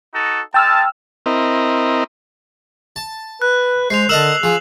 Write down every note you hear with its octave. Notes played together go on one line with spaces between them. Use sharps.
D#4 F#4 A4
G#3 G5 A5 E6 F6
C4 E4 A#4 D#5
A5
B4 F#6
G#3 C5 C7 F7
D3 A#4 D#5 A5 E6 E7 F#7
F3 G#4